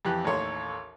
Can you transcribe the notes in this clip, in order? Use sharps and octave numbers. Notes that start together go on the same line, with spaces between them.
F2 E3 G4 F#6
A1 D#2 A4 C#5 C6 C#6